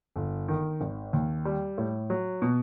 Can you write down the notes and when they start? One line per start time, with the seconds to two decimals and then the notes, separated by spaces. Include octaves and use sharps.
0.16 G1
0.48 D#3
0.81 G#1
1.13 D#2
1.45 G3
1.78 A2
2.10 F#3
2.42 B2